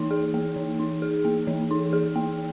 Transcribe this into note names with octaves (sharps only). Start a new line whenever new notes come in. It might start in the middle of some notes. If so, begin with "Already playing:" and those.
Already playing: E3 A#3 D#4
G#4
A#3
E3
D#4
G#4
A#3
E3
D#4
G#4
A#3